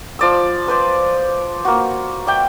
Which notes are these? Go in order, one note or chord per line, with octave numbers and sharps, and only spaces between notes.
F3 D5 E6
B4 C5 D5
A#3 F#4
D5 E5 G5 D6